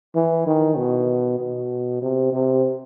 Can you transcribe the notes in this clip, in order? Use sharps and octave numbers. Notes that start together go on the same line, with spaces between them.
E3
D#3
B2
B2
C3
C3